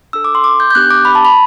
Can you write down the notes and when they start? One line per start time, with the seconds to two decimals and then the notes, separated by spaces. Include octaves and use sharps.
0.13 D4 A4 E6
0.24 D6
0.35 C6
0.44 D6
0.60 G6
0.71 G6
0.75 B3 D4 G4 F#6
0.90 D6
1.05 B5
1.15 A5
1.25 B5